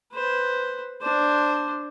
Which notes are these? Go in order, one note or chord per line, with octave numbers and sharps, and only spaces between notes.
B4 C5
D4 C5